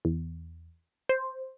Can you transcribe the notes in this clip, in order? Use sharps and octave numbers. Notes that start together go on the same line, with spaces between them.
E2
C5